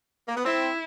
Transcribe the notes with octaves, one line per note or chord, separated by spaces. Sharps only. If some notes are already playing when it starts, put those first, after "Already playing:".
A#3
B3
C4 E4